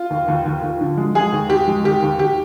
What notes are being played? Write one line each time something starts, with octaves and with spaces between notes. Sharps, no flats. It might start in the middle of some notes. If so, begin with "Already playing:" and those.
Already playing: F4
D#2
D#2
D#2
D#2
D3
G#3
G#3 G#4
D#2
D#2 G4
G#3
D#3 G4
D#2
D#2 G4